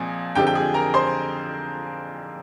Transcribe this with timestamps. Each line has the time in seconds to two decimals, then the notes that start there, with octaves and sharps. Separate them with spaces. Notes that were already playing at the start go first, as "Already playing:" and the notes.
Already playing: A#2 F3 G#3 C4 G#4
0.35 F2 D3 G#3 C4 G4 G5
0.47 G5
0.55 G#4 G#5
0.74 A#4 A#5
0.94 C5 C6